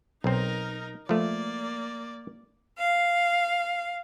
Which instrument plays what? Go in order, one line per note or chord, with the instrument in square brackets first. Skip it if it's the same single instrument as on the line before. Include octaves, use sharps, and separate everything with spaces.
[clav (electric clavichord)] B1 C4 [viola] D#4 A#4
[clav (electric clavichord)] F3 A3 [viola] A#3 D5
[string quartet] F5